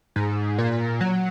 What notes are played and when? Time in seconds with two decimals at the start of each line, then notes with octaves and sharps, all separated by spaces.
0.16 G#2
0.58 A#2
1.01 F#3